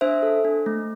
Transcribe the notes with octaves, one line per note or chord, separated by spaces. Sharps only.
D4 C5 E5
A4
D4
A3